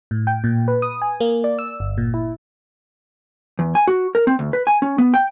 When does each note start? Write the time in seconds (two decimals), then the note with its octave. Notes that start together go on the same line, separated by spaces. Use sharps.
0.11 A2
0.27 G5
0.44 A#2
0.68 B4
0.82 D#6
1.02 G#5
1.20 A#3
1.44 D5
1.59 E6
1.80 G1
1.98 A#2
2.14 E4
3.59 E2
3.75 G#5
3.87 F#4
4.15 A#4
4.27 C4
4.39 D2
4.53 B4
4.67 G#5
4.82 C#4
4.98 B3
5.14 G5